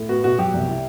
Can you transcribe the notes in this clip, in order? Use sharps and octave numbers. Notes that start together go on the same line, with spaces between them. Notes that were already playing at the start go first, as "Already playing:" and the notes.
Already playing: A2
B3 F#4
B2 F#4
F#3 G4
C2
E4